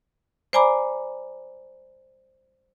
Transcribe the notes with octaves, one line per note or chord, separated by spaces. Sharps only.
C5 D5 G#5 A#5 B5 D6